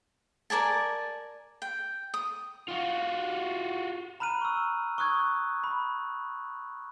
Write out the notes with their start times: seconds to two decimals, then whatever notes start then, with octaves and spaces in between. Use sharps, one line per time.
0.50 A#4 D5 G#5 A5
1.62 G5
2.14 D#6
2.68 F4 F#4
4.20 A#5 B5 F6 F#6 D#7
4.41 C#6 E6
4.98 C#6 D#6 F#6 G#6
5.64 B5